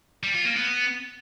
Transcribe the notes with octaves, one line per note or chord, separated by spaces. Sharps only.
G3
F4
A#3
B3